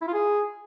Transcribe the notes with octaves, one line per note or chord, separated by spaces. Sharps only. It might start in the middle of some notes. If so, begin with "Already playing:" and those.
E4
F4
G#4